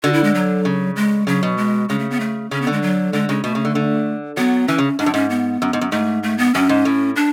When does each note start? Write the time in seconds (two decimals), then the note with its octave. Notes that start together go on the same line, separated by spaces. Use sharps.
0.03 D3 F#4
0.13 E4
0.24 G#3
0.35 F#3
0.65 C#3
0.96 G#3
1.27 C#3 F#3
1.43 B2
1.58 G#3
1.89 C#3 G#3
1.99 A3
2.11 B3
2.20 A3
2.51 C#3 C#4
2.62 B3
2.67 D3
2.72 G#3
2.82 F#3
3.13 D3 G#3
3.29 C#3 G#3
3.44 B2 A3
3.55 C#3
3.65 D3
3.75 D3
4.37 F#3 B3
4.68 E3 C#4
4.78 C#3
4.99 G#2 D4
5.06 F#2
5.14 G#2 C#4
5.30 B3
5.62 F#2
5.73 G#2
5.81 F#2
5.92 G#2 A3
6.23 A3
6.38 B3
6.54 F#2 C#4
6.69 G#2
6.85 A2
7.16 D4